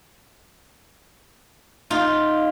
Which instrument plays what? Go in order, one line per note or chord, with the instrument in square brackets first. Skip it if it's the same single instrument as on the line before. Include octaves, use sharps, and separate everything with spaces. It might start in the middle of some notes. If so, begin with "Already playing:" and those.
[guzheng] D#4 F4